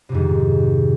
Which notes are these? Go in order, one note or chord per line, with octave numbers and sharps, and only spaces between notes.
F2 G#2 C3 D#3